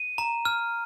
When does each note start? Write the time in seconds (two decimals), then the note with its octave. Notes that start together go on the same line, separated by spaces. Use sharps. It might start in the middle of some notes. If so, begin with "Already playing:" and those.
Already playing: D#7
0.18 A#5
0.45 F6